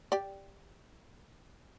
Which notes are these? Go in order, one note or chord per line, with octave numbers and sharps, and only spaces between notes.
G4 D5